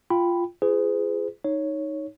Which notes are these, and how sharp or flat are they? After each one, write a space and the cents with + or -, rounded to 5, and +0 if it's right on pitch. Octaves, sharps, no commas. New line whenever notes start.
F4 -10 G5 +0 B5 +5
F4 -30 G#4 +0 B4 +45
D#4 +0 C#5 +0